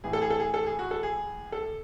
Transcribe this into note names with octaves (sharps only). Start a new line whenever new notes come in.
A2 E3 G#4
A4
G#4
A4
G#4
A4
G#4
F#4
A4
G#4
A4